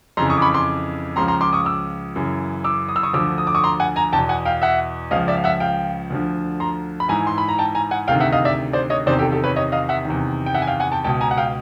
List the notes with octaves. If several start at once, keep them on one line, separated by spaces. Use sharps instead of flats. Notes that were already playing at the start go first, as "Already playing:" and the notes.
F2 C#3 E3 A#5 C6
C#6 D#6
D6
B5 C#6
C6 D6
C#2 C#3 F3 A#5 C6
A#5 C6
C6 D6
C#6 D#6
D6 E6
F#2 C#3 E3
D6 E6
D#6
E6
C#6 D#6
D2 D3 F3 D6 E6
D#6
D6
C#6 D#6
A#5 C6
F#5 G#5
G#5 A#5
E2 B2 G5 A5
F#5 G#5
F5 G5
E5 F#5
C#2 C#3 F3 D#5 F5
D5 E5
F5
E5 F#5
F5 G5
D2 D3 F3
A#5 C6
B5
G#2 E3 G#5 A#5
C6
B5
A#5
G5 A5
G#5 A#5
F#5 G#5
D2 C3 D#3 F5 G5
E5 F#5
D#5 F5
D5 E5
C5 D5
C#5 D#5
E2 C3 D#3 C5 D5
G4 A4
G4 A4
B4 C#5
C#5 D#5
D#5 F5
E5 F#5
E2 C3 D#3
G5
E5 F#5
G#5
F5 G5
F#5 G#5
G5 A5
C#2 B2 G5 A5
G#5 A#5
F#5
F5 G5